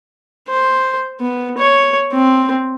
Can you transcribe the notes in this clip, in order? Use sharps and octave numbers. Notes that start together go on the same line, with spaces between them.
C5
B3
C#5
C4